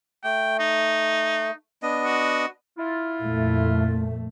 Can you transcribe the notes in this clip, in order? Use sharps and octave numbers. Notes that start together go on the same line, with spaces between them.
A3 G5
D#4
B3 D4 D#5
F#4
E4 F4
F2 A#2 A3